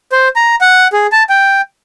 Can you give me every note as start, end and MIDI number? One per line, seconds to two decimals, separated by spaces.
0.12 0.28 72
0.36 0.55 82
0.61 0.87 78
0.93 1.07 68
1.12 1.23 81
1.29 1.61 79